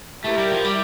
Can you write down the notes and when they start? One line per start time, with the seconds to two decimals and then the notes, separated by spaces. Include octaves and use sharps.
0.24 A3 E4 G4 A#4
0.38 G3
0.51 F3
0.64 G3